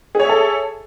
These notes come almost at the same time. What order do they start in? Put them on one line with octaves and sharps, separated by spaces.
G#4 C#5 E5 A4